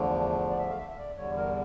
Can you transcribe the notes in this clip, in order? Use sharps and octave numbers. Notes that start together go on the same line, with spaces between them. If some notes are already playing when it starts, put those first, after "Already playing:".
Already playing: E2 D3 F3 A3 D4
D5
E5
F5
E5
E5
D5
E2 D3 G3 C#5
A#4